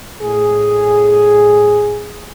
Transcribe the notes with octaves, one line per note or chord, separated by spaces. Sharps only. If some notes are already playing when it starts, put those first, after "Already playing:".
A2 G#4